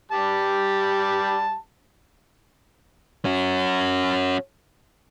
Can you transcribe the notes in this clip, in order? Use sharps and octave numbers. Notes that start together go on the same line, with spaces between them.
G3 G4 A5
C#4 F#4